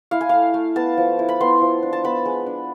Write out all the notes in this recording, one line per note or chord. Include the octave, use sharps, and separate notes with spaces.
E4 F5
G#5
A3 F5
A3
B3 A5
F3
E4
B5
B3 C6
F3
D4
A5
B3 B5
G#3
D4